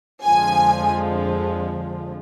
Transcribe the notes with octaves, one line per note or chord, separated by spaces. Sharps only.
F2 D3 F3 G#3 G#5